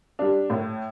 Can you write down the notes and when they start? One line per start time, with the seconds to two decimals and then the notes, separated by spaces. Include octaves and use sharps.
0.19 G3 D4
0.50 A2